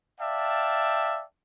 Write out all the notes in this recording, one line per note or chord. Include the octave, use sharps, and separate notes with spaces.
D5 E5 F5 G5 A5